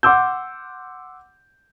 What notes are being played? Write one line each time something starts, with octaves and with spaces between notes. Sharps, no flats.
F#5 C6 D6 E6 G6